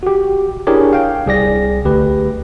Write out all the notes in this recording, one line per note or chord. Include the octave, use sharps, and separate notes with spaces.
F#4 G4
D4 E4 G4 G#4 A#4 C#5
F5 G5
C2 G#4 D5 A#6
D2 G4 B4